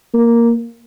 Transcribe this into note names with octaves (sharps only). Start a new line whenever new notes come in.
A#3